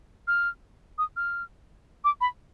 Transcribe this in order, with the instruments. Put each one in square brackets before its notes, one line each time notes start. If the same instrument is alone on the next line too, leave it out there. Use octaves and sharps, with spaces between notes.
[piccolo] F6
D#6
F6
D6
B5